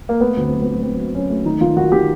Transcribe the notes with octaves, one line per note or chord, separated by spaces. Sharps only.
A#3
A3 B3
D2 C4
F#3
B3
F#3
F#3 C4
A3
F#3 C#4
A3
D#3 D#4
D#3 F4
D#3 F#4
D#3 G4